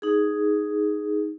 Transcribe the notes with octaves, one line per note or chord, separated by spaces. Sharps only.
D#4 G#4